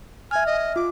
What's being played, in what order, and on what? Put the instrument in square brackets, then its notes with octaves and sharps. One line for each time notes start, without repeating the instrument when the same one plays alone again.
[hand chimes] E5 F6 [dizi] G#5
[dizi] D#5
[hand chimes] F4 [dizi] D6